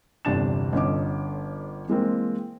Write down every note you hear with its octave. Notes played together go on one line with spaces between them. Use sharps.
G1 E2 C3 D4 A6 E7
G1 D3 C#4 D#5 D6
E3 G#3 A#3 C4